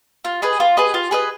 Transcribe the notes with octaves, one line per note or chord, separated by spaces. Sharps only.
F4
G#4 B4 D#5
F4
G#4 B4 D#5
F4
G#4 B4 D#5